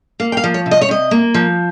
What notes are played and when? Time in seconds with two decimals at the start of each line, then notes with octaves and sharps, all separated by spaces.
0.20 A#3 F5
0.32 G5
0.37 F5
0.44 F3
0.54 C#5
0.66 C3
0.71 D#5
0.81 C#5
0.89 C3 D#5
1.11 A#3
1.34 F3